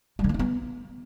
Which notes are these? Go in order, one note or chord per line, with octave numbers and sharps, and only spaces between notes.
G3
D3
A#3
D#4
B3